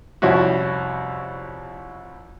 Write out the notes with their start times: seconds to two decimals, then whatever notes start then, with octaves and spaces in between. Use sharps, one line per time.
0.22 C2 F2 C#4 E4 F#4